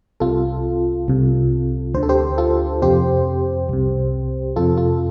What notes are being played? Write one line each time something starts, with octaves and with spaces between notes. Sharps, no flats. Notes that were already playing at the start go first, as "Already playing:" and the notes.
C2 C3 F4 A4
C2 C3
D2 D3 C5
A4
G4 C5
F4 A4
F2 C3 G4 C5
C2 C3
F2 C3 F4 A4
F4 A4